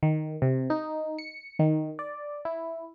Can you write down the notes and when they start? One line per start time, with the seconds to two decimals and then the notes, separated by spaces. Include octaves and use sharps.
0.03 D#3
0.42 C3
0.70 D#4
1.18 C#7
1.59 D#3
1.99 D5
2.45 E4